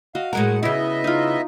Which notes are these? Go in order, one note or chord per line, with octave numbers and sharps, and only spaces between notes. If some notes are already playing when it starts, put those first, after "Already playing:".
F#4 D#5 F5
A2 G#3 A#4 F#5 A#5
C#3 B3 E4 D#5 E5
D#4 F4